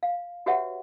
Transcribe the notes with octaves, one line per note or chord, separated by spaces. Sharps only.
F5
F#4 G4 B4 C#5 E5 F#5